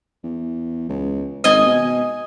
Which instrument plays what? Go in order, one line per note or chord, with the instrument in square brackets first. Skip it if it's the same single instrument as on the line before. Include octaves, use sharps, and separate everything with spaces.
[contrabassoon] E2
C#2
[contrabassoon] G#1 [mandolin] D#5 G#5
[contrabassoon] B2